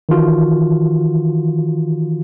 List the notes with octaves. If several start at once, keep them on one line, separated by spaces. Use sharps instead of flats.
D#3 E3 F4 F#4